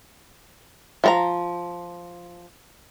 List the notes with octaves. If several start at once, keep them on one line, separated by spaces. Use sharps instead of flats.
F3 A4 A#5